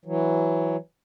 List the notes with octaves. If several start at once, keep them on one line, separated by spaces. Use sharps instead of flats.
E3 F#3